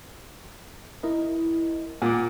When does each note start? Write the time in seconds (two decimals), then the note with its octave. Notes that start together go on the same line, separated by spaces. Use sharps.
1.03 E4 A#4 D#5
2.02 A#2 F#5 D6